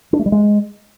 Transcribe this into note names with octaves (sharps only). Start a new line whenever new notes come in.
D4
A3
G3
G#3